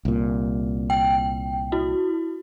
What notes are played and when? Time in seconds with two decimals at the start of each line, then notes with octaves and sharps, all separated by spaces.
0.05 C2 A#2
0.90 G5
1.72 E4 F#4